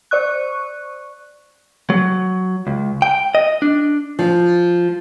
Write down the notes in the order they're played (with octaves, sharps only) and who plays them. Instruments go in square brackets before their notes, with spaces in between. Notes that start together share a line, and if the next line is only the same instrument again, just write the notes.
[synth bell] C5 D5 C#6 F#6
[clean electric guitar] F#3
C#2
G5
D#5
D4
[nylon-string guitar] F3